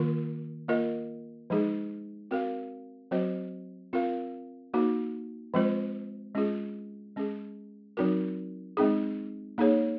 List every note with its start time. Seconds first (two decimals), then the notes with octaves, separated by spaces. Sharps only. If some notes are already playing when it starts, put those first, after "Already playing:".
Already playing: D#3 A#3 F4 A#4
0.68 A#3 F4 A#4 D#5
1.50 F3 G#3 D#4 G#4
2.31 C4 F#4 A#4 F5
3.11 F#3 C4 F#4 C5 D#5
3.93 C4 F4 A#4 F5
4.74 A#3 D#4 F#4
5.54 F3 G#3 C4 F4 C5
6.35 G#3 C#4 F4 G#4
7.16 G#3 C#4 G#4
7.97 F#3 C4 D#4 F#4 A#4
8.77 G#3 C4 D#4 G#4
9.58 A#3 D#4 G#4 C#5